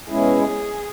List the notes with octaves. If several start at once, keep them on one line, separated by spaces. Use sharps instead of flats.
B2 G#3 C#4 E4 G#4